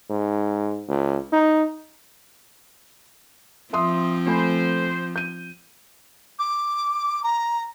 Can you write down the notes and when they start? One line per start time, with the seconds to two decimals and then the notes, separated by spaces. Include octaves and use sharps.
0.10 G#2
0.88 C#2
1.33 D#4
3.73 F3 C4 E5 C6 D#6
4.27 A3 C5 G#5 B5
5.16 G6 D#7
6.39 D6
7.23 A#5